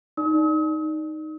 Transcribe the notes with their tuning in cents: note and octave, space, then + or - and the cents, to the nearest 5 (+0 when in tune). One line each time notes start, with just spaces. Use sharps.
D#4 +0 D5 +0 D#6 +45